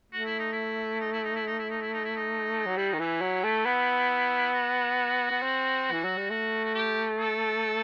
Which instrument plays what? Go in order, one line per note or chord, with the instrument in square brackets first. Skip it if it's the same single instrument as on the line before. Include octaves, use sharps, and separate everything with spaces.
[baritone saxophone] A3 [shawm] F#4
[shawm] E4
D#4
E4
D#4
E4
D#4
E4
D#4
E4
D#4
E4
D#4
E4
D#4
[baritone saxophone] F#3
[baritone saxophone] G3 [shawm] E4
[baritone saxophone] D#3 [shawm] D#4
[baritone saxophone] E3 [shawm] E4
[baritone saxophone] F#3
A3
B3
[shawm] F#4
[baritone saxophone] B3
C4
E3
F#3
G3
[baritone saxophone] A3 [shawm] F#4
[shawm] F#4
G4
A4